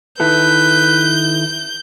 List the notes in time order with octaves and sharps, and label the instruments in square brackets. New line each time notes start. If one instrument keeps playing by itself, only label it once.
[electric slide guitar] D#3 E4 A4 [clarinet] B4 [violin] G6